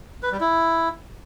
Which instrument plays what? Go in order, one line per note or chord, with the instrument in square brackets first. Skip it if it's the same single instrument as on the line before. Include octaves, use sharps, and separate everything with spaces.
[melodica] B4
G3
E4